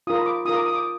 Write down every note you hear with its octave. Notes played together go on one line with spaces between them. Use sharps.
F4 A#4 D#6
B5
D6
F4 A#4 D#6
D6
D#6
D6